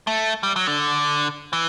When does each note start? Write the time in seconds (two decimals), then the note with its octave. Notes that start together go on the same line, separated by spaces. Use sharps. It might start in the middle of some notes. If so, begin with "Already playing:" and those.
0.07 A3
0.43 G3
0.56 F#3
0.67 D3
1.53 E3